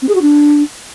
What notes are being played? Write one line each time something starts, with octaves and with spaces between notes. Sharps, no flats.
C4
G#4
F#4
D4